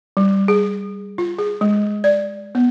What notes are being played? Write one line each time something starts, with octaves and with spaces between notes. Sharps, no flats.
G3
G#4
F4
G#4
G#3
D5
B3